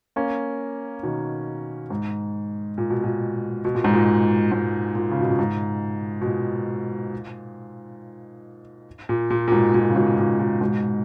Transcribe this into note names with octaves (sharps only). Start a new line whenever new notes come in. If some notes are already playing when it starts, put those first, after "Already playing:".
A#3 C#4
B2 D#3
G#2
A#2
B2
A#2
B2
A#2
G#2
A#2
G#2
A#2
C#3
B2
A#2
G#2
B2
A#2
A#2
A#2
A#2
G#2 B2
A#2
C#3
G#2 B2
A#2
A#2
G#2 B2